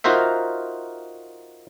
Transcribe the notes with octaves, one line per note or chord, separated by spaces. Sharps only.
D#4 F4 F#4 A#4 C5 E5